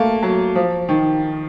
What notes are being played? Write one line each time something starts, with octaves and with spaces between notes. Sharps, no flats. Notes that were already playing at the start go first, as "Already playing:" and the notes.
Already playing: A3 A#3
F#3
F3
D#3